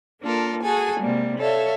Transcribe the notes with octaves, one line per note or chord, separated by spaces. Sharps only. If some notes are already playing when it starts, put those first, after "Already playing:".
A#3 D4 F4 A4 A#4
F#4 G#4 A4 G#5
C3 G3 G#3 A#3
A4 C#5 E5 F5